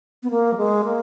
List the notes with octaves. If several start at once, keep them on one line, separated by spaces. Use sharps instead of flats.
B3
A#3
F#3
G#3
A#3